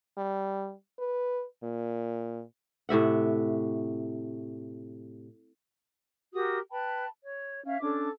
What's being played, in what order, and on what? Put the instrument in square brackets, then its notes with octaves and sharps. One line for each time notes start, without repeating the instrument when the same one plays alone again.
[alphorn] G3
B4
A#2
[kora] A2 C3 E5 F#5
[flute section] F#4 G4 A#4 D#6
B4 G5 A5 B5
C#5
C#4 E5 F5
C#4 D4 A4 D6